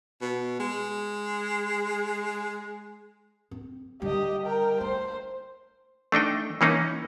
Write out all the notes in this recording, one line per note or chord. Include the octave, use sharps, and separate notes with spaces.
B2
G#3
C4
D3 G3 G4 D#5
A#4 G5
A3 C5
A3 D4 D#4 G5
E3 A#3 C#4 D#4